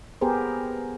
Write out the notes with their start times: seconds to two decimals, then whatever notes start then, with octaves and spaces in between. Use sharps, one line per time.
0.21 B3 G4 G#4 A#4 C5